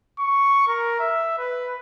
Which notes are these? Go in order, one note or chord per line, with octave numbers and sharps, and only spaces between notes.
C#6
A#4
E5
B4